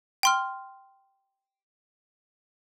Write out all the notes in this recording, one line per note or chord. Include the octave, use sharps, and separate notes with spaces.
G5 C6 F6